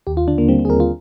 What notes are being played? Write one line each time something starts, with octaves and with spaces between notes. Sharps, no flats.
D#2 G4
F4
D3 D4
A#3
G3 C4
C4
G#4
D#2 A#4
F4